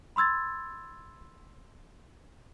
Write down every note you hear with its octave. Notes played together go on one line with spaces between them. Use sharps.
B5 C6 E6 G#6 A6